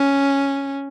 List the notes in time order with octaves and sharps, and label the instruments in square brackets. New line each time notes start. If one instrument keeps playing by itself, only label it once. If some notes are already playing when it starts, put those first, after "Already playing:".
Already playing: [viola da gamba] C#4